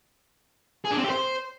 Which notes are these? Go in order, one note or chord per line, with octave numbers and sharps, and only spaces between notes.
G#4
D4
C4
G4
C5